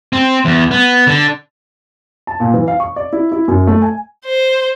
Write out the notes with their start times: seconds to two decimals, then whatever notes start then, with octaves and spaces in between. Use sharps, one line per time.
0.13 C4
0.45 E2
0.71 B3
1.07 D3
2.27 A5
2.40 A#2
2.54 E3
2.68 F5
2.80 C#6
2.96 D5
3.13 E4
3.32 E4
3.48 F#2
3.67 A3
3.82 G#5
4.25 C5